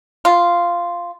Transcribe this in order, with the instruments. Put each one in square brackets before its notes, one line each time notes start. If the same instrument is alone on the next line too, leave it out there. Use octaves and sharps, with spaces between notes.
[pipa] F4